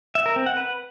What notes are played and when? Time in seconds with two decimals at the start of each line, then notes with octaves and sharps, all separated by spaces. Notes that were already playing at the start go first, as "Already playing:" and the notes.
0.15 E5
0.26 A#4
0.36 C4
0.46 F#5
0.57 B4